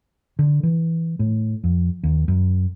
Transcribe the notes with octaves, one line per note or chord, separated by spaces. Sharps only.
D3
E3
A2
F2
D#2
F#2